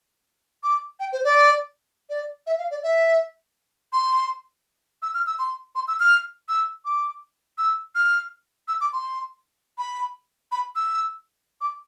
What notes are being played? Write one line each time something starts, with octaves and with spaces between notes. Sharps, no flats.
D6
G5
C5
D5
D5
E5
F5
D5
E5
C6
E6
F6
E6
C6
C6
E6
F6
E6
D6
E6
F6
E6
D6
C6
B5
B5
E6
D6